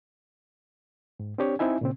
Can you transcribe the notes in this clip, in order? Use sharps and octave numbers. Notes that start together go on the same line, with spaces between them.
G#2
C4 D4 G4 C#5
C4 D#4 E4 E5 G#5
A#2 C#3 C4